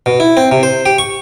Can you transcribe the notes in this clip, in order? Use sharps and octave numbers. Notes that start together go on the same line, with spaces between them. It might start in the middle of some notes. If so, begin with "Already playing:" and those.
B2
E4
C4
C3
C5
G4
C#6